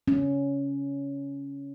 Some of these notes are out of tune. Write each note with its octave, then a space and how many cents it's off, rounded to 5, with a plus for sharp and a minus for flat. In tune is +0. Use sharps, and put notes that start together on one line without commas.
C#4 +10